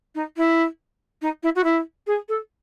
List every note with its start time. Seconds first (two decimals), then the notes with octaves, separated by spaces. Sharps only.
0.15 D#4
0.37 E4
1.22 D#4
1.43 E4
1.55 F#4
1.64 E4
2.07 G#4
2.28 A4